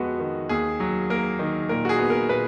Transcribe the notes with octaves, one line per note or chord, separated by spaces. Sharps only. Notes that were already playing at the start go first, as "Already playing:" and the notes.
Already playing: F2 G#3 B3 F#4
D#3
D#2 G#4
F#3
A#3 A#4
D#3
A#2 A#4
F#4
G#4
B3
A#4
A#2 B4